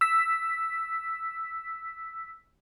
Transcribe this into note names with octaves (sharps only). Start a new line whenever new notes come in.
E6 B6